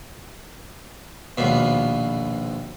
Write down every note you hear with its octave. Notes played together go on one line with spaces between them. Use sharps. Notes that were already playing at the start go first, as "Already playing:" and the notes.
A#1 D#2 B2